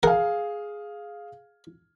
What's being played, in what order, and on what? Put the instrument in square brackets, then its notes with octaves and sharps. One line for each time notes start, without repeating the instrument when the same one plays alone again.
[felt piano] G#4 F5 [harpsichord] A#4 F#5